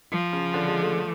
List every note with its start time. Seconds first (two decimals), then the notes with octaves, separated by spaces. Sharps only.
0.12 F3
0.33 C#3
0.54 D3
0.68 G#3
0.83 A3